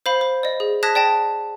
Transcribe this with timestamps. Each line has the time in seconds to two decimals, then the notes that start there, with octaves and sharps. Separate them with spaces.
0.06 C5 F5 B5
0.21 C5
0.43 D5 D#5
0.60 G#4
0.83 A5 D#6 F#6 G#6 A#6 B6
0.95 D5 G5 A5 A#6